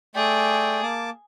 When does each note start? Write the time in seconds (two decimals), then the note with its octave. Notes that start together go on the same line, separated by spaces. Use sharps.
0.15 A3 G#4 D5 G5
0.83 A#3 A5 D6